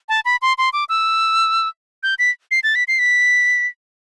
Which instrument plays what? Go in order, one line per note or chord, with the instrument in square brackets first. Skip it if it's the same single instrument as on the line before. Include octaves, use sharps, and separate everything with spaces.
[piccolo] A5
B5
C6
C6
D6
E6
G6
B6
C7
A6
B6
C7
B6